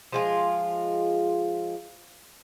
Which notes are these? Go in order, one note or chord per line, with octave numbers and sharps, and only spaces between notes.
F3 G#3 F4